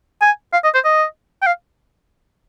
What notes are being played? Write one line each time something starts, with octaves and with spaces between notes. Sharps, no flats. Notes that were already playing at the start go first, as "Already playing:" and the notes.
G#5
F5
D#5
C5
D#5
G5
F5